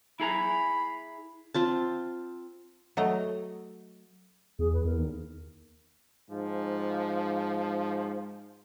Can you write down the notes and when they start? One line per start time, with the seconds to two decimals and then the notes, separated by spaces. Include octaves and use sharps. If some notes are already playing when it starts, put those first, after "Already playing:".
0.20 E4 G#4 A#5 B5
1.54 C4 F4 A5
2.97 F#3 A3 D#5 A#5
4.59 E2 G#4
4.73 B4
4.85 E2 A#4
4.98 D#2
6.30 G#2 F3